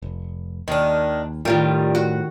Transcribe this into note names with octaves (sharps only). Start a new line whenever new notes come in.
F1
D#2 D#3 D4
A2 D#3 G3 F4 A#4
F#4